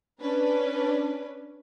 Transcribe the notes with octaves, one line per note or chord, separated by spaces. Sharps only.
C#4 D4 B4